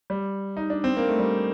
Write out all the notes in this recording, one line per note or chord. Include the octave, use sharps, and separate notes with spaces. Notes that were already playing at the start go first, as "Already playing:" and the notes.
G3
D#4
D4
C4
A#3
A3
G3